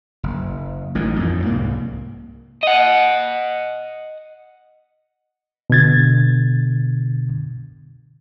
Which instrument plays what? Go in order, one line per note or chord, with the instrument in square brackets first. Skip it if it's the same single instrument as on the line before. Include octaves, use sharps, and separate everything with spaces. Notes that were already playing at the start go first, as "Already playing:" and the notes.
[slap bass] F#1
A1 A2 D#3
F2 A2 D#3
C2 G#2 A#3
[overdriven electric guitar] D#5 F#5
[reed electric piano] B2 D3 G#6 A6